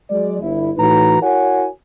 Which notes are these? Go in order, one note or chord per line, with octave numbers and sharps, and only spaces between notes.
F#3 G#3 D5
G1 E4
A2 E3 D#4 F#4 B4 A#5
E4 F#4 A#4 C#5 F#5 G#5